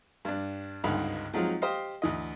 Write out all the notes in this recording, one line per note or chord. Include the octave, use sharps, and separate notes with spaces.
G2 D4
G#1 C#2 G2 D3 D#4 B5
F3 F#3 G#3 C4 D#4 F4
G4 C5 D#5 F5
D2 E3 D#5